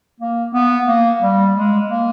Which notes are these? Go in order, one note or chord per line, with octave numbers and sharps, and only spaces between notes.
A#3
B3
A#3
G3
G#3
A#3